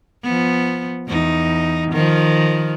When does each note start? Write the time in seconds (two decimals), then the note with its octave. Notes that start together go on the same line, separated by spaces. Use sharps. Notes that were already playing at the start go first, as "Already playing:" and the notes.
0.23 F3 B3
1.08 E2 D#4
1.91 D#3 F3